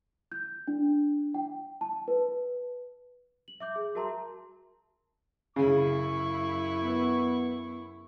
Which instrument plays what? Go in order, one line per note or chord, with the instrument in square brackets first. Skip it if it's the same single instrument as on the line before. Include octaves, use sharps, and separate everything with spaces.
[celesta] G6
D4
G5
A5
B4
F#7
E5 D6 G6
G#4
F#4 A#4 E5 A5 A#5 C6
[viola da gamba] F#2 E4 [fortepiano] C#3 [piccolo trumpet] C#6
[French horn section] B3